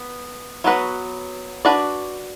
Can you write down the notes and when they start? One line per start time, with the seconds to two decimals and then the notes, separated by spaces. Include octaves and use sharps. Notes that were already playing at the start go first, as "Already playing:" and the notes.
Already playing: B3
0.64 F#3 B3 F#4 B4
1.65 D4 F#4 B4 D5